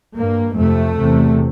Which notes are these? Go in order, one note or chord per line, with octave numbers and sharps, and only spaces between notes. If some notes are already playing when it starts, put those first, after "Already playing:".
G2 A#3
F2 C3 A3
E2 C3